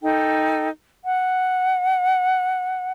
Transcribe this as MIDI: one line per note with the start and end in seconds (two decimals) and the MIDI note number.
0.03 0.69 63
0.03 0.69 69
0.03 0.69 79
1.04 2.92 78